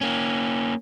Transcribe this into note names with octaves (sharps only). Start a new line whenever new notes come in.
A#3 C#4